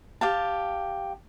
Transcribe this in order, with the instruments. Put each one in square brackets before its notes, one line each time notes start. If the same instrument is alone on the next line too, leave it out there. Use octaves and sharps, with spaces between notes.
[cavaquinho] G4 F5 A5